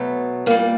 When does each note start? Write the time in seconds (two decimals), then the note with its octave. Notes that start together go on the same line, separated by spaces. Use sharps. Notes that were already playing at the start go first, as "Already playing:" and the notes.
Already playing: B2 F#3 A3
0.46 A#2 A#3
0.50 G3